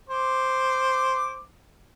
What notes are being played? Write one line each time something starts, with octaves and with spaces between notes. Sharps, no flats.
C5 D6